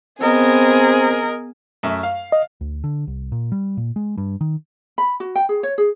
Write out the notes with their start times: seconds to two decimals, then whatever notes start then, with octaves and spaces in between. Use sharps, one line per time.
0.21 B3 C4 G#4 A#4 D#5
1.83 F#2 A3 E5
2.03 F5
2.32 D#5
2.61 D2
2.84 D3
3.07 C2
3.32 A#2
3.52 G3
3.77 A#2
3.96 G#3
4.18 G2
4.41 D#3
4.98 B5
5.20 F#4
5.35 G5
5.49 G#4
5.63 C#5
5.78 G#4